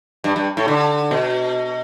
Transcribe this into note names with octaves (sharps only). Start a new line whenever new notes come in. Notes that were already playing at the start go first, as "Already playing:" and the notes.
G2
G2
A2
D3
B2